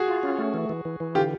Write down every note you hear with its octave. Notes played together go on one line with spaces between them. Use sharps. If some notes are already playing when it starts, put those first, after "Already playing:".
Already playing: F#4 G#4
F4
C#4
A3
E3
E3
E3
E3
D3 F4 G4